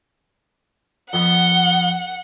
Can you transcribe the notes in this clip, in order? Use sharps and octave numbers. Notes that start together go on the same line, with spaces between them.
F2 B3 F#5 G7